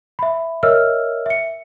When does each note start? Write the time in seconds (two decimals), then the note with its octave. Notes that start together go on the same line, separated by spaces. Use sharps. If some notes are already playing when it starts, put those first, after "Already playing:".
0.19 E5 B5
0.63 A#4 C#5 D#5 E5 E6 F6
1.26 E5 C#7